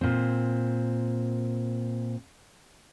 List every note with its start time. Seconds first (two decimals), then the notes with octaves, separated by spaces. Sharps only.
0.01 A#2 C4